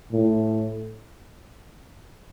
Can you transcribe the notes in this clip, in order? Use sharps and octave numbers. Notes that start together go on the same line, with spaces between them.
A2